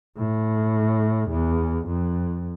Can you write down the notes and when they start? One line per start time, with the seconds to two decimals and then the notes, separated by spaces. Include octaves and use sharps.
0.18 A2
1.30 E2
1.86 F2